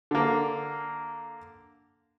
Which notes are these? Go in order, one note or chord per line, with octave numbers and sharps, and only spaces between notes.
D3 A#3